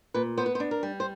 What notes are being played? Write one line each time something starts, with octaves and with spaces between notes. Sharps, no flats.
A#2 B4
B3 C5
B4
C5
D4
A#4
G3
C5